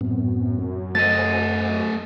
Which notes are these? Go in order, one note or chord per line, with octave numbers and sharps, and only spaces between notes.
F#2 A2 B3 C4
A3 C5 D#5 F#5 G#5 A6